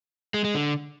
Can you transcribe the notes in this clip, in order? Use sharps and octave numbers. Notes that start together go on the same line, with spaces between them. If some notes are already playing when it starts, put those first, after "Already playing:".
G#3
G#3
D3